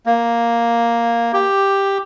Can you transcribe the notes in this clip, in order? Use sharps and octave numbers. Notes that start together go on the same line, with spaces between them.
A#3
G4